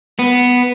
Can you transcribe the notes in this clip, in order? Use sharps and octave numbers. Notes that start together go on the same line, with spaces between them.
B3